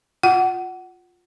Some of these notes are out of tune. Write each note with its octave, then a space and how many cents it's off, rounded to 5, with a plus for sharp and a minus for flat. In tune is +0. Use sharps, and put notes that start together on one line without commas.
F4 +15 F#5 +20